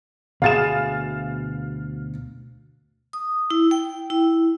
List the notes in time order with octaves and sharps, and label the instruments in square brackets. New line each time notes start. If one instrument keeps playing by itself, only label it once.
[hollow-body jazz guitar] D2 B2 G#4 [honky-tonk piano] F5 A6 E7
[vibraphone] D#6
E4
G5
E4